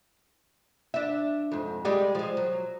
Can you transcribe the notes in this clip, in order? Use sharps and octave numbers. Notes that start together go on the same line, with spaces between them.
D4 E5
F2 G#2
G3 G#3 G4
F3 G#3
F#3